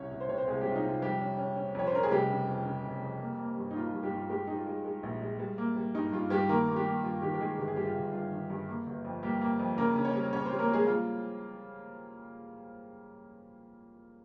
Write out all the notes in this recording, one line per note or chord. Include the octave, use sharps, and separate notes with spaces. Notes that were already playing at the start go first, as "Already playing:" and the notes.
Already playing: C2 C#4 C#5
C2
C5
C3 C#5
C4 C5
C2 G#3 G#4
C3 G3 G4
F4
D#4
C3 F4
F2 G3 G4
C#4
C#4
C#4
F2 C#5
C5
C#4 A#4
G#4
F1 G3 G4
C#3
F2
C#3
F1
F2
A#3
A#3
G2
D#4
A#3 F4
G2 F4
G3 G4
G2 F4
G3 G#3 G4
G#3 D#4
F4
G#3
G#3
A#1
G#3
G3
A#3
G3
G2 D#4
G2 F4
G2 G3 G4
D#3 A#3 A#4
A#3
G3 G4
A#3
G2 F4
D#3 G3 G4
G4
D#3 G#3 G#4
G1 G4
G#4
G2 G3 G4
F4
G1
G2 F4
D#3
G2
A#3
G1
F2
G3 A#3 G4
A#3
F2
C#3 A#3 A#4
C#3
C#4 C#5
G3
C#3 C#4 C#5
C4 C5
G3
A#3 A#4
G3 G#3 G#4
A#3 F4